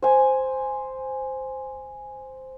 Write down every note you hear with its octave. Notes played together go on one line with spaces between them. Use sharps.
C5 G#5